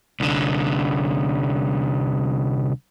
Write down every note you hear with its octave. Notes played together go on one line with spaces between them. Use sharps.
C2 D3